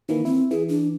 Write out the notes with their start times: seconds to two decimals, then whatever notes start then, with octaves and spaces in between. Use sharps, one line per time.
0.09 D#3 E3 A#3 E4
0.25 C4 E4
0.51 E3 G#4
0.68 D4